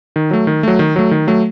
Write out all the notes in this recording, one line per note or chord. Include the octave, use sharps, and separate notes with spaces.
D#3
F#3 A3
D#3
F#3 A3
D#3
F#3 A3
D#3
F#3 A3